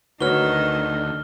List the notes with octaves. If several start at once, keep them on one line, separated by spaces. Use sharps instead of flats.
D2 D#3 D#4 F#4 B4 C#5 F6 G7